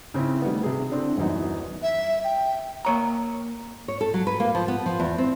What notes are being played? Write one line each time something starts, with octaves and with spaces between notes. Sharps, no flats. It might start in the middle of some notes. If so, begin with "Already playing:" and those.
C#3 C4 D#4 E4
D#3 G3 A3 B3
C3 G#4
D3 C4 D4 E4
D#1 F#2 E3 B3 D#4
E5
G5
A#3 C#5 A#5
C#5
A4
F#3
B4
A#3
F3
B3
F3
E2
C4